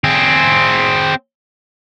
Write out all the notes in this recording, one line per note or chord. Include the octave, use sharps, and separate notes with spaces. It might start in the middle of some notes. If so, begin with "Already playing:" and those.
C4 G#4